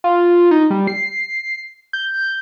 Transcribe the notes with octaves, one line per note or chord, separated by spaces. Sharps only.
F4
D#4
G3
C7
G6